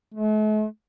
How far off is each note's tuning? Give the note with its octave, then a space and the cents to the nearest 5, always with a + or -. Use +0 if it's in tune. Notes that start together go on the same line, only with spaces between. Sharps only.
A3 -45